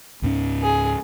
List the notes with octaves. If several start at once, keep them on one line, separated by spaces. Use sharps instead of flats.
C#2 G#2 C#4
G#4